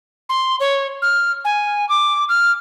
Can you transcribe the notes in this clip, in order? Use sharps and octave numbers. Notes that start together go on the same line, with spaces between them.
C6
C#5
F6
G#5
D6
F6